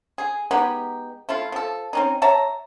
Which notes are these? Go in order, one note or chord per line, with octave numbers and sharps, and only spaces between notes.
G#4
G#3 B3 D#4 G4
A3 E4 F4
F3 A4
C4 C#4 D#4
C#5 E5 A5 A#5